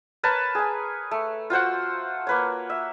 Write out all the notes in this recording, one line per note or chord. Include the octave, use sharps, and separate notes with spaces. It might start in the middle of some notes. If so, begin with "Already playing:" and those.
A#4 B4 C#5 A5
G#4 G#5
A3
F4 F#4 C5 F#5
A#3 B4 C#5
E5